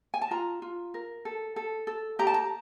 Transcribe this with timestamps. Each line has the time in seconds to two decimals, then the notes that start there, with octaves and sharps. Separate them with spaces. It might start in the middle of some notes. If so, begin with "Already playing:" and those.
0.14 G#5
0.22 A5
0.31 F4 A#5
0.62 F4
0.94 A#4
1.25 A4
1.56 A4
1.87 A4
2.19 G4 A#5
2.27 A5
2.34 A#5